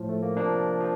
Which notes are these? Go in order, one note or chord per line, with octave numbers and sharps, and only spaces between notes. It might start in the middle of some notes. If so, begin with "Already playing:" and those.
Already playing: A2 F3
A3
A#3
C3 F3 A#3 D4
F3